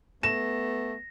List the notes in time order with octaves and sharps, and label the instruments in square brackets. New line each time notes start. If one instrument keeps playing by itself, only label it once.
[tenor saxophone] A3 [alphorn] B3 [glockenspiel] A#6 [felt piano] E7